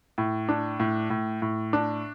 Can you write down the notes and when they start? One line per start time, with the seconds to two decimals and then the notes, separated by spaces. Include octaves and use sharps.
0.18 A2
0.49 D4
0.80 A2
1.10 A2
1.42 A2
1.73 D4